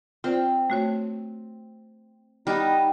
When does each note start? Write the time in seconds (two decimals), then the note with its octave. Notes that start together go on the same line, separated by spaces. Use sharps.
0.24 C4 F4 C5 D5
0.70 A3 F#4 C#5
2.47 G3 B3 D#4 F6